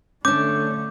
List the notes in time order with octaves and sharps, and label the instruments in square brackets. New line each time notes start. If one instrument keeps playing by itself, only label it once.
[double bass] D3 A3 [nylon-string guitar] C#4 D4 [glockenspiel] D6 [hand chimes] G6